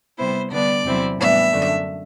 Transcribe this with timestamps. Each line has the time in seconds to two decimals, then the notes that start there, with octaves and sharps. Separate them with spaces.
0.18 C3 G3 B3 E4 C5
0.51 D3 G3 B3 D4 D5
0.84 E2 C3 F#3 C4 E4
1.18 A2 E3 G3 B3 D4 E5
1.51 F#2 D3 A3 D4